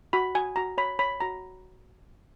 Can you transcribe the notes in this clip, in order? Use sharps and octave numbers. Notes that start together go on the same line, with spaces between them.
F#4 B5
F#4 G#5
F#4 A#5
C#5 B5
C#5 B5
F#4 A#5